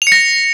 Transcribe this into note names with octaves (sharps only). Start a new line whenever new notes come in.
F7
C#7
A#6